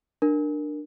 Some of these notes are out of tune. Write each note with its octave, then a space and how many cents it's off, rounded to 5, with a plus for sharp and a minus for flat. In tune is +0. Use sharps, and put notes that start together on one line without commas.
D4 +20 A#4 +0